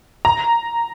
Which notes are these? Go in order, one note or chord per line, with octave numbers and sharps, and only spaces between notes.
A#5